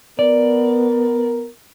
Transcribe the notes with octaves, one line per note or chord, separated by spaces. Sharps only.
B3 A#4 D5